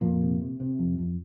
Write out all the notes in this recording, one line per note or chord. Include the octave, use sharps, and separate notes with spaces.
F2 A#2 A#3
C3
C3
C3
F2
F2